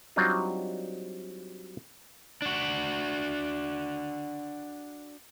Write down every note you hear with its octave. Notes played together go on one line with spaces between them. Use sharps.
F#3 G3 C4 D4 D#4 F4
D4 F#4